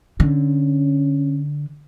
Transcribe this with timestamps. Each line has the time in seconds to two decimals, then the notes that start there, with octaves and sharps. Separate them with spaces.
0.20 D3 C#4